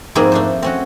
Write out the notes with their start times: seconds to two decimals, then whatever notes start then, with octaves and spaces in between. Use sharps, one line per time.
0.15 F2 G#2 A#3 C4 E4 G#4
0.32 A3 D4 C5
0.63 C4 C#4 F#4